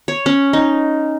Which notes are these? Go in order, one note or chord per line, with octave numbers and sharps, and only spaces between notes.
C#5
C#4
D#4